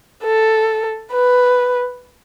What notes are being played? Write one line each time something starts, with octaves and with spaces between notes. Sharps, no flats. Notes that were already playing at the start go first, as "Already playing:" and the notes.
A4
B4